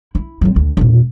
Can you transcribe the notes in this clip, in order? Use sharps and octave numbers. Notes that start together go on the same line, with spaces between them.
E4
F#3 C4
D2
E1 A#2